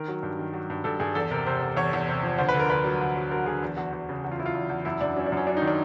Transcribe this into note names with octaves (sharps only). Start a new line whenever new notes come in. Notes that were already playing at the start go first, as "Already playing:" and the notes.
Already playing: D#3 A#4
F#3
G2
D#3
F#3
G2
G2 A4
G2 G#4
E2 A4
C3 A#4
C3 C5
E2
E2 C#5
E2
C3
F3
D2 C5
B4
D3
A#4
D2 B4
F#3
D2
F#3
F#3 A#4
D2 G#4
E2
E2 F#4
E2
C#3
E2 F#4
F4
F#3 E4
F4
E2
E2
F#2 E4
F#2 D4
F#3 C#4
D4
F#2 C#4
F#3 D4
D#4
D#3
D4